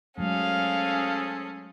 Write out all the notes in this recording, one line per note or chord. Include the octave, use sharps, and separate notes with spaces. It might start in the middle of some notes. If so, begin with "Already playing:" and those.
F#3 G#3 A3 C4 C#4 G#4 A4 F5